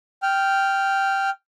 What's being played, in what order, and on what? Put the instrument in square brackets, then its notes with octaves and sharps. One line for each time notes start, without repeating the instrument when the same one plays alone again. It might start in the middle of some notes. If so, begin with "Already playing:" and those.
[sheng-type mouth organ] G5 F6